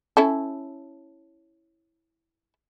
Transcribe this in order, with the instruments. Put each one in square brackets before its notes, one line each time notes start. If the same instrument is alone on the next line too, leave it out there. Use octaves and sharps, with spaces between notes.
[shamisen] C#4 E4 A4